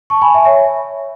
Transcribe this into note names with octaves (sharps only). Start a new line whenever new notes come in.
A5 C#6
G#5 B5
E5 G#5
C#5 E5